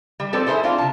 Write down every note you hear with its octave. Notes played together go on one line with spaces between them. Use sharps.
G3
F3 C4 A4 B4 D5
E4 G#4 A4 C5
C4 D4 F4
C3 A5